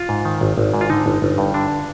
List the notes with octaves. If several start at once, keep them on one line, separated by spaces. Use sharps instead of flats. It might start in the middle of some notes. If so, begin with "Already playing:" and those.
Already playing: F4
G#2
D#3
G#1
G#1
G#2
F4
D3 D#4
G1
G1
G2
D3 D4